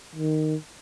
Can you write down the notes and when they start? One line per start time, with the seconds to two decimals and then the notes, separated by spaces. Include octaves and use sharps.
0.16 D#3